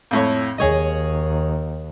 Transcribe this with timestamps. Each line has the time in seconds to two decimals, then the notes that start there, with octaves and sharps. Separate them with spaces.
0.11 F2 A2 C#5
0.58 D#2 G#4 C#5 D#5